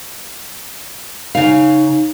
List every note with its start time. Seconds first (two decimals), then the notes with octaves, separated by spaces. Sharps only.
1.35 C#3 D#4 F5